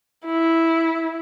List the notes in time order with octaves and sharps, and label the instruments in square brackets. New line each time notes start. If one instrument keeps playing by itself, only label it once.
[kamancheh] E4